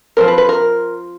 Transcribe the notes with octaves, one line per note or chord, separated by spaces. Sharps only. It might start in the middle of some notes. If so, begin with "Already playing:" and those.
F3 A3 C4 A#4
B4
B4
A#4